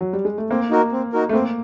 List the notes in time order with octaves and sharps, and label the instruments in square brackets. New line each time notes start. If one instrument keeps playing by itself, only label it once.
[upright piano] F#3
G3
G#3
A3
[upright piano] A#3 [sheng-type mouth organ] C4
[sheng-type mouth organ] D#4 F#4 A#4
C4
D#4 F#4 A#4
[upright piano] A3
[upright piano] A#3 [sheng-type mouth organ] C4